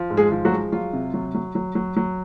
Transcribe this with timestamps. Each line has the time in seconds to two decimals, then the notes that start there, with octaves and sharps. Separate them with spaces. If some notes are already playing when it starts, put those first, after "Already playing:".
Already playing: F3
0.10 G#2
0.17 G#3 G#4
0.31 F3
0.45 F#3 F#4
0.52 G#3
0.72 F#3 F4
0.93 C3
1.14 F#3
1.34 F#3
1.55 F#3
1.75 F#3
1.96 F#3